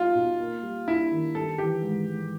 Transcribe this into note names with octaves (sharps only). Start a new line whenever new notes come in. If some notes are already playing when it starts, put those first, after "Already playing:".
Already playing: G3 B3 D#4 F4
B2
A#3
G3
D4 E4
D#3
G3 A4
E3 G4
G#2
G#2